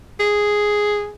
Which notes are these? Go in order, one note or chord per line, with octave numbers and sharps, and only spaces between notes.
G#4